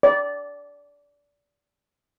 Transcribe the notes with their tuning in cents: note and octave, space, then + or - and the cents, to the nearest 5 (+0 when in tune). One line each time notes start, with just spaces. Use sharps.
D5 -25